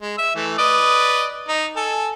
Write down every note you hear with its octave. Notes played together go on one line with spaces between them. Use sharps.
G#3
E5 E6
E3 A3
B4 D5 D#5
D#4
A4 G#5